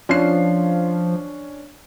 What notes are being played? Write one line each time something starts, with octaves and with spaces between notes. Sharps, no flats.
F3 C#4 D4 C7